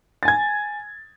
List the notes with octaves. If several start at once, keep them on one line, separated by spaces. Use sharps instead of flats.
G#5 G#6 A6